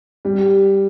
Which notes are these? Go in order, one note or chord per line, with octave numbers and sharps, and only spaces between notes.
G3